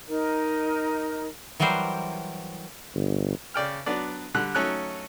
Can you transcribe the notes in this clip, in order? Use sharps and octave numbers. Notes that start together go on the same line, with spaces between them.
D#4 A#4
E3 F#3 G3 A#4 C5
G1
C#3 D5 G5 F6
F#3 B3 D4 D5
D3 G3 F#6
F#3 A3 C#4 D#4 F#6